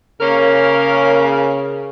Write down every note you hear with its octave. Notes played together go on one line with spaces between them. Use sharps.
C#3 A#3 C#4 A#4